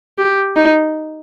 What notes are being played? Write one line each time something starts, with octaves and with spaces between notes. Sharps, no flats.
G4
D#4